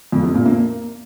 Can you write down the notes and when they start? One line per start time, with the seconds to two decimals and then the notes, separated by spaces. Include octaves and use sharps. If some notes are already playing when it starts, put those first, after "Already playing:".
0.12 F2
0.23 C3
0.35 A#2
0.46 A#3